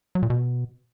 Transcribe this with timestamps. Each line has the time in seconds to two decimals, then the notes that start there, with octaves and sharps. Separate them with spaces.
0.15 F#3
0.23 A#2
0.30 B2